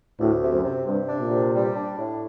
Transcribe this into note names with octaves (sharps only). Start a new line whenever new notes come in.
D2 A2
C3
F#2
C3
G2 C3
D4
A#2
C3
G3
D4
A2